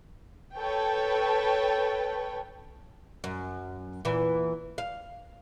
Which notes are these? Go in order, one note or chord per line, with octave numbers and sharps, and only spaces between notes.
A4 B4 C#5 G5
F#2
E2 A#2 E3
F5